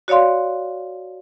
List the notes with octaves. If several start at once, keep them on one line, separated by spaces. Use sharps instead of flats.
F#4 C#5 D5 F5 C6